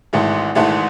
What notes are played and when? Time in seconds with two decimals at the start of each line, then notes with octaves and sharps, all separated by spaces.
0.13 G#1 G#2 E3 A3
0.55 G#1 G#2 E3 A3